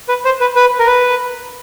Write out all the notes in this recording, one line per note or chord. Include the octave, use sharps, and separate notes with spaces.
B4
C5
B4
B4
A#4
B4